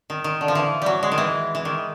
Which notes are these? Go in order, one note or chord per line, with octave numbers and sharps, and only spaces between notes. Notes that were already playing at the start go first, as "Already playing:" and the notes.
D#3
D#3
D3
F3
E3
F#3 G3
G#3
D#3
E3
E3
D#3